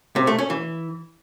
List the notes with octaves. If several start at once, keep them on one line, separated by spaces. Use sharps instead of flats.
C3
A3
C#4
E3